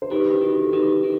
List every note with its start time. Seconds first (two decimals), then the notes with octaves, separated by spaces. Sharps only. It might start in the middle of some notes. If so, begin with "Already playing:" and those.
0.02 C5
0.11 D#3 G4 B4
0.34 E4
0.42 D#3 F#4
0.53 G4
0.63 A4
0.73 D#3 G4 B4
1.04 D#3